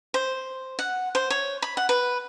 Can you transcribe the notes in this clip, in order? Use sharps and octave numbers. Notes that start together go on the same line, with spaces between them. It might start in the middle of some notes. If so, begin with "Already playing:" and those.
C5
F#5
C5
C#5
B5
F#5
B4